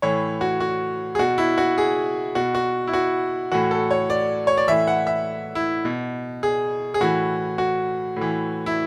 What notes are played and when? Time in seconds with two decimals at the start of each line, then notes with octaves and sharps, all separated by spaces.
0.02 A2 E3 C#5
0.41 F#4
0.60 F#4
1.15 G#4
1.19 B2 F#4
1.38 E4
1.58 F#4
1.78 G#4
2.35 B2 F#4
2.55 F#4
2.87 E4
2.93 F#4
3.52 A2 E3 F#4
3.71 A4
3.91 C#5
4.10 D5
4.47 C#5
4.57 D5
4.68 A2 E3 E5
4.87 F#5
5.07 E5
5.55 E4
5.85 B2
6.43 G#4
6.94 G#4
7.01 A2 E3 F#4
7.58 F#4
8.16 A2 E3
8.66 E4